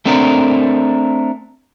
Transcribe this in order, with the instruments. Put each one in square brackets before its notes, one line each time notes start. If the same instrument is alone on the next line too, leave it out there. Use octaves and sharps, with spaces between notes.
[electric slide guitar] A3 C4 D4 A#4